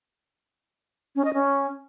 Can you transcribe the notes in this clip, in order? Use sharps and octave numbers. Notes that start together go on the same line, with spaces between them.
C#4
D#5
C#4